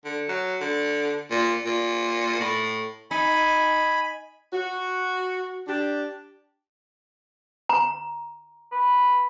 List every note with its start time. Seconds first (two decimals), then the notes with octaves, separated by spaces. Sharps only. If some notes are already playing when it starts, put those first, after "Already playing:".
0.05 D3
0.29 F#3
0.61 D3
1.31 A#2
1.66 A#2
2.40 A2
3.11 D#4 G#5 B5
4.53 F#4
5.68 D4 G4
7.69 A#5
8.72 B4